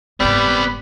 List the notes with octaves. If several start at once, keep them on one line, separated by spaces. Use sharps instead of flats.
F#1 G#2 G3 B3 C4 D5 B5